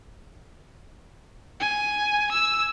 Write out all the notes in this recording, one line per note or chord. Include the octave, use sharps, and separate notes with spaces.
G#5
E6